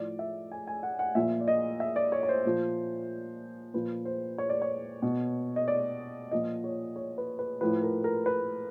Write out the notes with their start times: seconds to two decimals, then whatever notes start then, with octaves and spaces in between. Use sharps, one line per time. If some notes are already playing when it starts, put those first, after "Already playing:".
Already playing: A2 F3 D5
0.19 E5
0.51 G#5
0.67 G#5
0.83 F#5
0.99 F#5
1.15 A#2 F3 E5
1.41 D5
1.48 D#5
1.80 E5
1.96 D5
2.12 C#5
2.23 C#5
2.29 C5
2.45 A#2 F3
3.74 A#2 F3 B4
4.05 C5
4.38 C#5
4.49 D5
4.62 C#5
5.02 B2
5.56 D#5
5.68 D5
6.31 A#2 F3 D#5
6.64 C#5
6.96 C#5
7.18 B4
7.39 B4
7.61 A2 F3 B4
7.83 A#4
8.04 A#4
8.26 B4